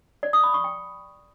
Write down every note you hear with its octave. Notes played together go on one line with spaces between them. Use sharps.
D5
D#6
B5
C#6
G5